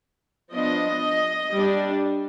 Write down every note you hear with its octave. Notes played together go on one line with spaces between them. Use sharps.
F3 B3 D4 D#5
G3 D4